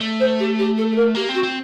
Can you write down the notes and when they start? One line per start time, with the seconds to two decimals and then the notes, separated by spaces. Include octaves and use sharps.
0.01 A3
0.20 C5
0.39 G4
0.59 G4
0.78 A4
0.91 A4
0.96 A#4
1.15 A#3 G4
1.29 C4
1.34 F#4
1.43 C4